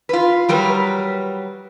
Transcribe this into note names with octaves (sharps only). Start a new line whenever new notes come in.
F4 B4
F#3 G3 A#4 B4